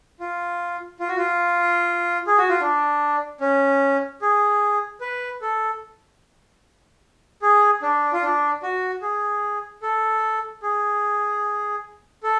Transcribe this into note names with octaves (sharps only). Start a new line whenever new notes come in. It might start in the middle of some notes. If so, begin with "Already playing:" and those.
F4
F4
F#4
F4
G#4
F#4
F4
D4
C#4
G#4
B4
A4
G#4
D4
F4
D4
F#4
G#4
A4
G#4
A4